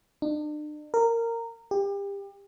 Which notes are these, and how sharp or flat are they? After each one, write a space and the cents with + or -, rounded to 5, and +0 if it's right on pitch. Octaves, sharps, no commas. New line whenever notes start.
D4 +40
A#4 -15
G4 +30